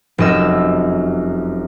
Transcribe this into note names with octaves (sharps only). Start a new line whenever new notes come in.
F1 F#2 D#5 E6